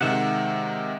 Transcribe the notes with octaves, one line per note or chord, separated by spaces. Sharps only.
C3 D#3 G#3 E5 F#5